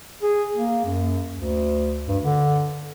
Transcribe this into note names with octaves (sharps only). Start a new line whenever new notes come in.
G#4
A#3
F#2
D2
G2
D3